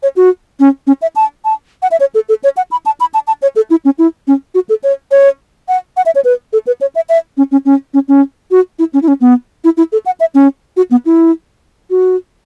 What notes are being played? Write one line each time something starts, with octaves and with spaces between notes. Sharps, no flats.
C#5
F#4
C#4
C#4
E5
A5
A5
F#5
E5
C#5
A4
A4
C#5
F#5
B5
A5
B5
A5
A5
C#5
A4
E4
C#4
E4
C#4
F#4
A4
C#5
C#5
F#5
F#5
E5
C#5
B4
A4
B4
C#5
E5
E5
C#4
C#4
C#4
C#4
C#4
F#4
E4
C#4
E4
C#4
B3
E4
E4
A4
F#5
E5
C#4
F#4
B3
E4
F#4